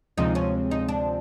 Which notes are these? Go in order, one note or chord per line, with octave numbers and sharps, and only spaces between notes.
D2 C3 F3 G#3 C4 D#4
C#4
D#4
D4